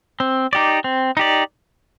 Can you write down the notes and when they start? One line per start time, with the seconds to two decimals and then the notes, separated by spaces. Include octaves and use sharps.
0.20 C4
0.53 D#4 G4 D5
0.84 C4
1.17 D#4 G4 D5